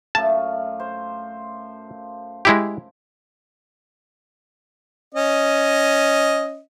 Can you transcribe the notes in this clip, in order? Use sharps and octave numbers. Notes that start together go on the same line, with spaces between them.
F#2 A3 F5 A5
C5
G#3 E4 G4
C#4 D#5